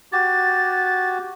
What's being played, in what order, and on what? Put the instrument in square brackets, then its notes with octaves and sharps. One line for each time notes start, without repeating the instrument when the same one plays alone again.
[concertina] F#4 G4 [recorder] A6